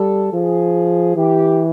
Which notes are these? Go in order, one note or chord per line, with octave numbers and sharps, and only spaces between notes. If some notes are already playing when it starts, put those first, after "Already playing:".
Already playing: G3 A4
F3 G#4
E3 G4